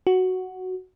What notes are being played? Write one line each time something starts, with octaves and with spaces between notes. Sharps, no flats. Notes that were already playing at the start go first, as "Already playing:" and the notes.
F#4